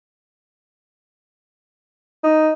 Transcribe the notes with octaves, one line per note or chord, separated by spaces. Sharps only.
D#4